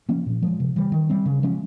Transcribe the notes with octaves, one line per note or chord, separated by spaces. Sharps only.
F3 A#3 C#4
A#2
F3 G#3
C3
E3 G3
D#3
G3 C4
C#3
F3 G#3 C#4